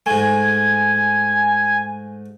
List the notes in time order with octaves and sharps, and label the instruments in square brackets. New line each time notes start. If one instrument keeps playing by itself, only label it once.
[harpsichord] G#2 A3 [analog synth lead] G#5